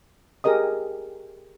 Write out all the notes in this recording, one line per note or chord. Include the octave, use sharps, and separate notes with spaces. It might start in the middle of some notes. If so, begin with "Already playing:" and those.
G4 G#4 A#4 D#5 D#6